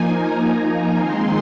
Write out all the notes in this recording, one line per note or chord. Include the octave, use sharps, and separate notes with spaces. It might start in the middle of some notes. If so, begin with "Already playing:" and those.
Already playing: F3 A#3 D#4 G#5
A#5
G#5
D#3 G#3 C4 D#4 C6